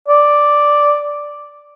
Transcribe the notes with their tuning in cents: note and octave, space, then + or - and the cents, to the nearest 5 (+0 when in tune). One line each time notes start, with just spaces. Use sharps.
D5 +0